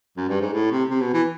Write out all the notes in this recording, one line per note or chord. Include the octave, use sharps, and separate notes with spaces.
F#2
G2
G#2
A2
C3
C3
B2
E3